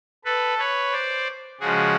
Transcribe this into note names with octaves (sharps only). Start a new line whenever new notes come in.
A4 B4
B4 C#5
C5 D5
C#3 F3 G#3 F#4 G#4